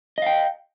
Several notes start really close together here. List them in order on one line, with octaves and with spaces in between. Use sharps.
D#5 F5 G5